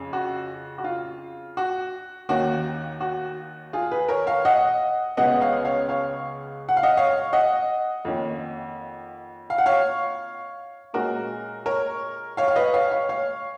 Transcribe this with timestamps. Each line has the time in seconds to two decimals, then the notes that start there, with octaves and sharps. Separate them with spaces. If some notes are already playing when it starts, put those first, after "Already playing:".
Already playing: F2 C#3
0.13 F#4
0.78 F#4
0.84 F4
1.57 F#4
2.29 D#2 D#3 A#3 C#4 F#4
3.01 F#4
3.73 F4 G#4
3.91 G#4 B4
4.08 A#4 C#5
4.27 C#5 F5
4.45 D#5 F#5
5.17 C#2 C#3 G#3 B3 D#5 F#5
5.41 C#5 F5
5.65 C#5 F5
5.89 C#5 F5
6.69 F#5
6.77 F5
6.83 D#5 F#5
6.97 C#5 F5
7.33 D#5 F#5
8.05 F2 D#3 A#3 C#4
9.50 F5
9.58 F#5
9.66 C#5 F5
10.93 A#2 G#3 C#4 F#4 A#4
11.66 A#4 C#5
12.37 C#5 F5
12.48 F5
12.56 B4 D#5
12.74 C#5 F5
12.91 C#5 F5
13.09 C#5 F5